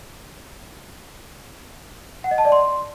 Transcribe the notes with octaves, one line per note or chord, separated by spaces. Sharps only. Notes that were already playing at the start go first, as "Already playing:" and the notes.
F#5
D#5
A5
D5
C6